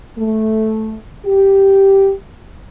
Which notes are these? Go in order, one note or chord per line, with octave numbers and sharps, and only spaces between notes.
A3
G4